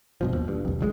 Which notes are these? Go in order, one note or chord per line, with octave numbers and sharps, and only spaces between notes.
G2 B2 F3
D#2
G2
C2 F2
D1 A1 F#3 G#3